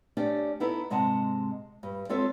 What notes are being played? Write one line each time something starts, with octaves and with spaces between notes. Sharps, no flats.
A3 C#4 D4 G4 D5
B3 D#4 E4 A4
G#2 C3 G#3 D#5 F#5 A5
G2
G#3 C4 F4 A4 C#5 E5